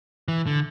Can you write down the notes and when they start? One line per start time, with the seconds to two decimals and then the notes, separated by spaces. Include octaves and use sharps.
0.28 E3
0.47 D3